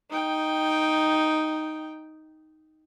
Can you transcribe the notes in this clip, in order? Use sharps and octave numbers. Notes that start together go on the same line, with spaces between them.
D#4 G5